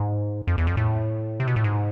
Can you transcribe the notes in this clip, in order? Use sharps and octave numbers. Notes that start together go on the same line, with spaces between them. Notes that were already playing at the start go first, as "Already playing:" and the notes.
Already playing: G#2
F2
E2
F2
A2
C3
B2
A2
G#2